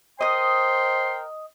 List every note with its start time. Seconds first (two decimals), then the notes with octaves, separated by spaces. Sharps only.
0.21 A#4 C5 D#5 G5 C6 D#6